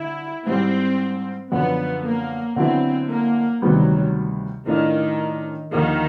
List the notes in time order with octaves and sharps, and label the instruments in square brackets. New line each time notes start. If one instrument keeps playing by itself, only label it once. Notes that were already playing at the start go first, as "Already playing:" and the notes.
Already playing: [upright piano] D3 [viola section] E4
[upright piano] G#2 E3 G3 [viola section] C4
[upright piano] F#2 D3 F3 [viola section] B3
[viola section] A#3
[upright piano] D3 F#3 B3 E4 [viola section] C4
[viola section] A#3
[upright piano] D2 C3 D#3 G3 B3 [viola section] F#3
[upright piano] A2 E3 A3 D4 F4 [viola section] D#3
[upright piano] D#2 D3 F3 A#3 [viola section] D#3